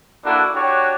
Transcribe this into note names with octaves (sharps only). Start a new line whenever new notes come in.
A#3 D4 E4 F#4 A4
D4 F#4 G4 C#5